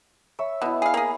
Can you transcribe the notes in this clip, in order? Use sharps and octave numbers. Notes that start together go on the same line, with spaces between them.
C#5 E5 E6
B2 B3 E4
G#4 F5
A#3 G#4